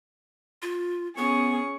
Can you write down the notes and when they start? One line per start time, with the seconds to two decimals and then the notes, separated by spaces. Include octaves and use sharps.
0.62 F4
1.17 B3 C#4 G#4 C#6